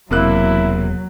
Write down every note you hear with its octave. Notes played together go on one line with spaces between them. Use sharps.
E1 C3 F#3 A#3 E4 F#6